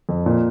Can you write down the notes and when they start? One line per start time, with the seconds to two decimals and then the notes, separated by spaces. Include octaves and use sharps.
0.09 F2
0.26 A#2